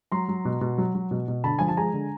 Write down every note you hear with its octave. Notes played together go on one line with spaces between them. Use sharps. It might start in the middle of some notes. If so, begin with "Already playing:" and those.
F#3 A#5 C6
F#3
B2
B2
F#3
F#3
B2
B2
D3 A5 B5
F3 G#5
A5
G#3 G#5 A#5
D3